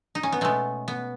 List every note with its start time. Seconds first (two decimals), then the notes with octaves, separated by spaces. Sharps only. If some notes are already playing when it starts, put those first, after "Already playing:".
0.15 D#4
0.23 C#4
0.32 B3
0.41 B2 G#3 A3
0.88 B3